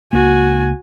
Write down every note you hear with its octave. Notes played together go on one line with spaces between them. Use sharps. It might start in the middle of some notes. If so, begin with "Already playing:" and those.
C#2 A#3 F#4 G#5